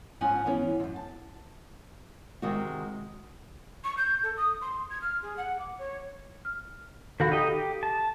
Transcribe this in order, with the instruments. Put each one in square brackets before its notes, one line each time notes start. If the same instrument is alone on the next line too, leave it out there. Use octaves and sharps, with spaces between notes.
[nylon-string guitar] G#2 F3 C#4 F#5 G#5
E3 B3 C#4
F#2 C3
A5
C3 D#3 G#3 C4 F#4
[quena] C#6
G6
A4
D#6
C6
G#6
F6
G#4
F#5
D6
C#5
[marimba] F6
[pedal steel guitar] D#3 F#4 [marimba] A4 F5 B5
[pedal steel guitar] D#4 G4 D#5
G4
A5